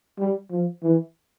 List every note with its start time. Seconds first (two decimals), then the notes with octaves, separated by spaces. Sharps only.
0.19 G3
0.51 F3
0.83 E3